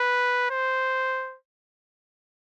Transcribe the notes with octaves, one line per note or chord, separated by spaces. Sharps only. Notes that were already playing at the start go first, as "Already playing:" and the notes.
Already playing: B4
C5